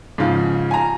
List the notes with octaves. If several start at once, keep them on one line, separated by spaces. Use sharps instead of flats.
G#2 C#3 F3 F4
G#5 A#5